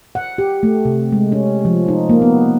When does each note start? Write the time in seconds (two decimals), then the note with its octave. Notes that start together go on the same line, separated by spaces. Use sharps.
0.15 F#5
0.38 G4
0.63 A3
0.85 C3
1.12 G#3
1.32 C#4
1.65 F3
1.88 D#4
2.09 A#3
2.22 B3